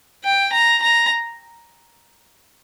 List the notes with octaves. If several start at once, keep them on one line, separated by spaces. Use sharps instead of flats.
G5
A#5
A#5